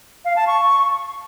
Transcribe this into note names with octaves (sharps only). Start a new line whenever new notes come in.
F5
A5
C#6